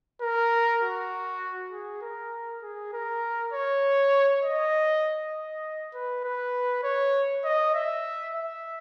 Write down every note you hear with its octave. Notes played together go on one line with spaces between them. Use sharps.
A#4
F#4
G#4
A#4
G#4
A#4
C#5
D#5
D#5
B4
B4
C#5
D#5
E5
E5